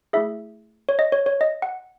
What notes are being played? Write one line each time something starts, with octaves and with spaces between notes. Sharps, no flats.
A3 E4 G#4 E5
C#5
D#5
C#5
C#5
D#5
F#5